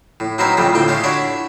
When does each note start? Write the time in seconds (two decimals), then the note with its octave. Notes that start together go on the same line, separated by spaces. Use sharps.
0.20 A2
0.38 F#3 C4 D#4 E4 A#4 B4
0.57 F2 A2 C#3 G3 A3
0.74 D2 A2 C4 G5
0.88 G#3 A3 F4 G4 C#5
1.04 D4 E4 F#4 C#5 D5